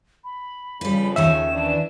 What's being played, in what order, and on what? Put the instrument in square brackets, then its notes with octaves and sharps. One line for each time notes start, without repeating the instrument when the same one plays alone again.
[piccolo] B5
[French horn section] F2 C#3 [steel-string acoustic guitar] G3 B4
[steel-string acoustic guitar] D#2 D#3 C#4 [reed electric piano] E5 [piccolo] E7
[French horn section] E3 D4